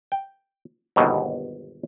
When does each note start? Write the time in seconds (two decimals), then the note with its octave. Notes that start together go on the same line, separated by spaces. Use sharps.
0.12 G5
0.96 G1 D#2 G#2 B2 F#3